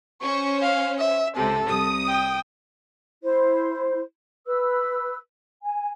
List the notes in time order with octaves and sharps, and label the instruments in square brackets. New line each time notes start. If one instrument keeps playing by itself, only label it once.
[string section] C#4 C5 [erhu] C#6
[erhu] F5
E5
[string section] C#2 C3 [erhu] A4
[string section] C2 D#6
[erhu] G5
[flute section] E4 C5
B4 E6
G#5